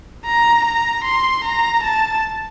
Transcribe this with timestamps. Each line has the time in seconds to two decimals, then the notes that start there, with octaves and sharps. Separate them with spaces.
0.26 A#5
0.65 A#5
1.05 C6
1.44 A#5
1.84 A5